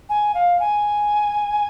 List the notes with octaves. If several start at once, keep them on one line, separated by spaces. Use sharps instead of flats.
G#5
F5
G#5